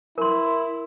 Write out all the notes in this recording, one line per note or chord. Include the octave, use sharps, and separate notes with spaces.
E4 A#4 C6